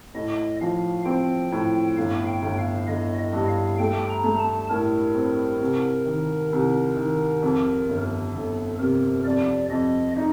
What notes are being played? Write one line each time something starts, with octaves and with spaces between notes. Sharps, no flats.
A2 D#5
F3 F5
C4 G5
A2
G1 F5
G5
G1
F5
G1 D#5
D#5
G2
F5
A3 G5
A#5
A3
A5
A2 A#4
C4
C2
D#3
C2
D#3
F2
G1
G1 A4
C3 A#4
F2 D5
F2 D#5
D#4